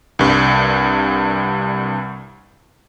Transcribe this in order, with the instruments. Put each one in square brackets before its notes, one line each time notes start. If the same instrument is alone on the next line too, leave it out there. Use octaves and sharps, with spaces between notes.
[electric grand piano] C2 G2